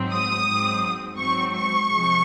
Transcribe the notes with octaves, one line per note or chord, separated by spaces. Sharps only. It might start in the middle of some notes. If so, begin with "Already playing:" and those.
Already playing: G#2 F#3 C4
D#6
G#2 F#3 C4
G#2 F#3 C4 C#6
C#6
C3 F3 G#3 C4